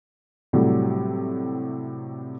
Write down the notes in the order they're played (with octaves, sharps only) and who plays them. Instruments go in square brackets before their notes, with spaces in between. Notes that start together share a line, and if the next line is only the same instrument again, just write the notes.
[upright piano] A2 C3 F#3 G3